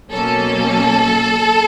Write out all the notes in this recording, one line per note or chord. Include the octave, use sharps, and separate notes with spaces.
B2 F#3 A#3 C#4 A4